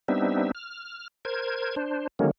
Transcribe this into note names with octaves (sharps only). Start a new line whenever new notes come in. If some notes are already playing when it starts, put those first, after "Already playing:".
G3 B3 C4 D4 D#4 E5
F6
A#4 C5 G#6
D4 C5
D3 D#3 F#3 G#3 A#3 C#4